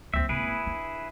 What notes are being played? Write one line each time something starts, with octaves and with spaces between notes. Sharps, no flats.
D2 F#3 C4 E5
D#1 G#1 E4 G#4 B4
D4